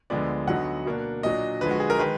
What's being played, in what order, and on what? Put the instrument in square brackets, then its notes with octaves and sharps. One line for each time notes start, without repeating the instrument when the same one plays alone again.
[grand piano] D2 D3 F3 G#3 B3 D5
D2 D3 F#3 B3 D#4 F#5
B2 A#3 D4
A#2 F#3 D4 D#5
D3 F3 G#3 B4
F#4
G#4
A#4
D#3 G#3 B4